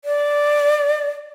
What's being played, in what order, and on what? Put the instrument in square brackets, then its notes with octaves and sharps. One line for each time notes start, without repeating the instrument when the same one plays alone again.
[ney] D5